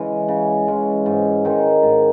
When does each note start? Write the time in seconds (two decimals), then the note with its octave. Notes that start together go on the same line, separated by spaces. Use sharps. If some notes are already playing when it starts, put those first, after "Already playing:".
Already playing: C#3 E3 G#3 C#4
0.28 C#3
0.67 E3 G#3 C#4
1.06 G#2
1.45 D#3 G#3 D#4
1.83 G#2